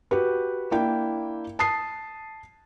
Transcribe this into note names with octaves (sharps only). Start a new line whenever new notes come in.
F#4 G4 B4
A#3 D4 E4 G5
A5 D#6 C7